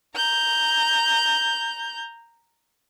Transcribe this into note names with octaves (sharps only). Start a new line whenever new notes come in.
A#5 G6